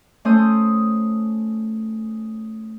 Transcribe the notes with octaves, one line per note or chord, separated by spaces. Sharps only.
A3 C#4 C5 D#6 G6